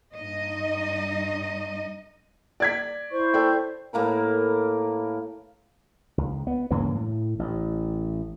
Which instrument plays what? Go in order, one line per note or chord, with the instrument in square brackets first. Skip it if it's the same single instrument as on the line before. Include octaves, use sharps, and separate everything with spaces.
[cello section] G2 D#4 D#5
[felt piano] D5 G#6 B6
[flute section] E4 C5 C#6
[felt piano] A4 D5 G5
[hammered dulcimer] A2 A#3 A#4 B4
[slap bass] C#2
B3
G2 C#3 E3 A#3
A2
A1